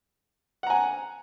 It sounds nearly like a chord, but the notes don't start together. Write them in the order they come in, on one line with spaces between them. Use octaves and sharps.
F#5 A#5 G#5